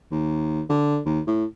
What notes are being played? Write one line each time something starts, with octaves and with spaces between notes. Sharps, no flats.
D#2
D3
D#2
A2